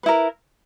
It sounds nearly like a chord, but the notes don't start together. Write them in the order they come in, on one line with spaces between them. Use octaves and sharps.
B4 E4 A#4